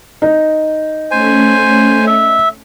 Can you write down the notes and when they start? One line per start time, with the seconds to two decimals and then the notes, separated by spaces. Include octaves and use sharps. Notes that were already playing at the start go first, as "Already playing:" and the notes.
0.22 D#4
1.11 A3 C#4 C5 G#5
2.07 E5